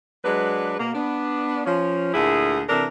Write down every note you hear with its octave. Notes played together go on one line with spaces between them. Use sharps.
F#3 G#3 D4 B4
B2 A#3
B3 D4
F3 C#4
D2 A#2 E4 G#4
C3 E3 D4 A4 A#4